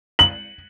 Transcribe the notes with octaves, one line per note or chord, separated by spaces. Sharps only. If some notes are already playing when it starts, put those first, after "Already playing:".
F#7